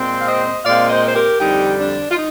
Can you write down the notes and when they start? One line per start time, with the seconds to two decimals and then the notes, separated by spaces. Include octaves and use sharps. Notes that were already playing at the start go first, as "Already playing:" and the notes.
Already playing: A#2 G#3 C4
0.19 F5
0.27 C5 D#5
0.64 A#2 G#3 C4 D5 F5
0.89 C5 D#5
1.08 C5
1.15 G4 A#4
1.40 F2 D3 G3 D#4 G4
1.79 D4
2.11 F4
2.16 D#4